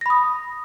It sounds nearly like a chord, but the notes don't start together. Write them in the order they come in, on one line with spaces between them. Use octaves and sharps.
A#6 B5 D#6